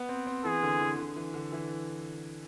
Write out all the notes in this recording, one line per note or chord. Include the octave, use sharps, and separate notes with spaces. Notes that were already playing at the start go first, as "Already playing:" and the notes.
Already playing: B3
C4
C4
E3 G#4
D3
E3
D3
E3
D3
E3